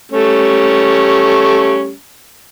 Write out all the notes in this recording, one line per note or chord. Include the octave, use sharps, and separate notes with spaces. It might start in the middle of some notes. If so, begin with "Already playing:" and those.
G3 A3 C#4